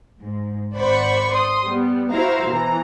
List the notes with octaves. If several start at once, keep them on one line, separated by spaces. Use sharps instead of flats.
G#2
G#1 C5 D5 F#5 B5 C#6
C6 D#6
G3 B3
E4 F#4 C5 E5 F5 A#5
B2 E3 A#5